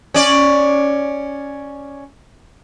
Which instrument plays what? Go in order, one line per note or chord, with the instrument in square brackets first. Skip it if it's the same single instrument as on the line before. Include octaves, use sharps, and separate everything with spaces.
[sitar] C#4 D5